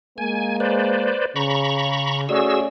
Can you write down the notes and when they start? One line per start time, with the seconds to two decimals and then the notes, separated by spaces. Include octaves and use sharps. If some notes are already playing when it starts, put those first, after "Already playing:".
0.18 G#3 A#3 G#5
0.60 B4 C5 D5
1.36 C#3 A#5 B5 C#6
2.29 A3 C#4 F#4 G#4 D5 E6